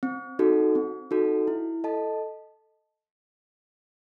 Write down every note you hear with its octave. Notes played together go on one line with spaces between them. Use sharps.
C4
D#4 F#4 A4
C4
D#4 F#4 A4
E4
A4 D#5 A5